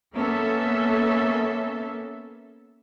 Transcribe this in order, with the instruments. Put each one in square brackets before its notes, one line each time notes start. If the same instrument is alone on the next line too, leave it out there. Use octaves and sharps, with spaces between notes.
[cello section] A#3 B3 C#4 A4 E5